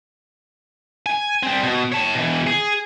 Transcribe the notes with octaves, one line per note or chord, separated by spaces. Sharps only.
G#5
G3 C4
B2
C#5 A5
B2 E3
G#4